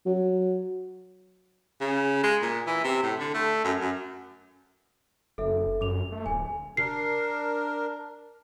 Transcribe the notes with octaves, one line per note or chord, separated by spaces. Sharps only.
F#3
C#3
G#3
A#2
E3
C3
A2
D3
A3
F#2
F#2
F#1 A4 E5
F#2 D6 F7
A3
D1 G#5
D4 A#4 C7